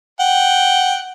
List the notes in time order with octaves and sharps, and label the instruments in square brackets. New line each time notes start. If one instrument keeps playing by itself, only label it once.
[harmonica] F#5 G5